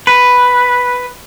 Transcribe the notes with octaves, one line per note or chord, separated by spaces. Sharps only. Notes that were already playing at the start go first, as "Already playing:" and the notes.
B4